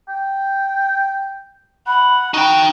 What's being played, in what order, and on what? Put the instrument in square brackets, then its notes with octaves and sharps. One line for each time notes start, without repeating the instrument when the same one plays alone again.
[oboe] G5
[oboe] F#5 [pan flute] B5
[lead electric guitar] D#4 G5 [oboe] F#4